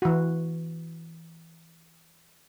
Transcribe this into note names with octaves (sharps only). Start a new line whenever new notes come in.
E3 F#4